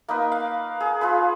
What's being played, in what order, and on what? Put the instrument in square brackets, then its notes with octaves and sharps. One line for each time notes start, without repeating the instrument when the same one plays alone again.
[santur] A#3 D#4 B4
F5
G#4
F4 G#4 B4